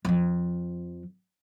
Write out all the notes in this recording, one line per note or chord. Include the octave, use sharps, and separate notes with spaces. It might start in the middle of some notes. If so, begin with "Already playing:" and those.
F2 F3